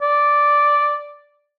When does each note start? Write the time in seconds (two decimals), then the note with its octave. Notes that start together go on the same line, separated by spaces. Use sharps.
0.02 D5